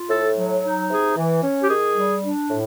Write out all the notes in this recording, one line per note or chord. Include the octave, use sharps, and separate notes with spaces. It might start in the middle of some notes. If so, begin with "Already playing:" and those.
Already playing: F4
A2 A4
F#3
D#4
C3 G#4
E3
C#4
G4
D#3 G#4
G3
D4
A2